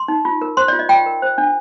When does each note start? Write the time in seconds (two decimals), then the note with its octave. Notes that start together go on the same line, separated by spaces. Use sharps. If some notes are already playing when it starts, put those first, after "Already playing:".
Already playing: C6
0.08 D#4
0.25 F4
0.41 A#4
0.57 C5 C6
0.68 D5
0.73 F4
0.79 D#5
0.89 F4 G5
1.06 A#4
1.22 C5
1.38 D4